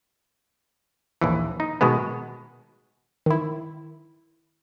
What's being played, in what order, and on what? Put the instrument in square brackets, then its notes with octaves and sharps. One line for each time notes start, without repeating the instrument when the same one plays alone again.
[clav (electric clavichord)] A#1 D#2 E3
D#4
B2 D#3 G#3 B3
[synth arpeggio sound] D#3 E4